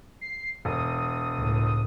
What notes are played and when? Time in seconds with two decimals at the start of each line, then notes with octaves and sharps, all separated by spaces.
0.21 C7
0.65 E1 D#6
1.36 C#2 A2